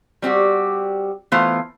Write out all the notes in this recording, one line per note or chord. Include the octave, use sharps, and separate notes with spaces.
G3 C4 F#4 G4
E3 A3 B3 F4 C5 F5